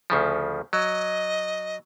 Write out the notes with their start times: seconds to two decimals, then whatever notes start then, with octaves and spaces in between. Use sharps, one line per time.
0.10 D2 C#3 F3
0.73 F#3 D#5